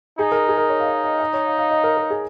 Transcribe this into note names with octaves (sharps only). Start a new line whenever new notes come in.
D#4 G#4
A#4
G#4
A#4
C#5
F5
D#5
D#5
D#5
C#5
F5
F5
D#5
A#4
A#4
G#4